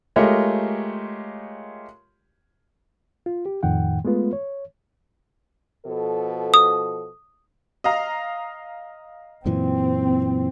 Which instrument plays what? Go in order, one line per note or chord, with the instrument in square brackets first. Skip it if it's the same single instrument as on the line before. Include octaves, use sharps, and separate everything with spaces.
[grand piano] G#3 A3 F4 G4 A#4 C#5
[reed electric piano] F4
G4
F2 A2 D#3 F#5 G5
G#3 A3 B3 F4 B4
C#5
[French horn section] B2 F3 A4
[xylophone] D#6
[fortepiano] D#5 F5 A#5
[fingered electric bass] F#2 A#2 E3 [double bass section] C4